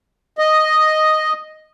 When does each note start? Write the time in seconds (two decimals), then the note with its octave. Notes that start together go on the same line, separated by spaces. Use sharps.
0.38 D#5